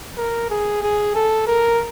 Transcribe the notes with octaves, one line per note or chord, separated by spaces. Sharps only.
A#4
G#4
G#4
A4
A#4